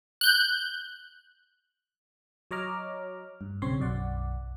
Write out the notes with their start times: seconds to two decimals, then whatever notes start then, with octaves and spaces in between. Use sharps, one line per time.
0.21 F#6 G6
2.51 F#3 C#5 D#5 A#5 D6 F6
3.41 G2
3.62 B1 C#3 C4 C#5 C6
3.79 B1 F#2 D5 F#5